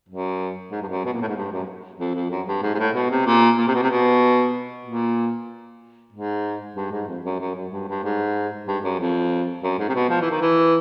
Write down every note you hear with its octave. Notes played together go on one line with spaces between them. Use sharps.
F#2
G#2
G2
F#2
B2
A#2
A2
G#2
G2
F#2
F2
F2
F#2
G2
G#2
G#2
A2
B2
C3
A#2
A#2
C3
B2
C3
B2
A#2
G#2
G2
G#2
F2
F#2
F#2
F#2
G2
G2
G#2
G2
F#2
F2
F#2
G#2
C3
B2
F3
E3
D#3
E3